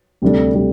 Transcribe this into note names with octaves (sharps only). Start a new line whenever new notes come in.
D2 C3 G3 D4 A4
C3 G3 D4 A4